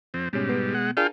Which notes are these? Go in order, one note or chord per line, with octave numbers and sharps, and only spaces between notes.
F2 C4
G#2 B2 G3 C#4
B2 B3
G#3 F#5
D4 F4 G#4 A#4 F5 G5